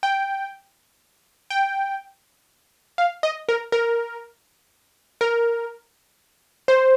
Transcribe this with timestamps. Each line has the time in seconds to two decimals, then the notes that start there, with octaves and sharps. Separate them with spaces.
0.03 G5
1.50 G5
2.98 F5
3.23 D#5
3.49 A#4
3.72 A#4
5.21 A#4
6.68 C5